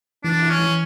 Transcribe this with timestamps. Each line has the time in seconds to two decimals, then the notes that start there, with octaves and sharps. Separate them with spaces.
0.24 E3 D4
0.42 E4
0.50 C#4
0.59 E3